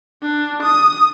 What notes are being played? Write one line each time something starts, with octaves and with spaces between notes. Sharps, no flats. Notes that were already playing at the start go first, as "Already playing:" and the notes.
D4
D#6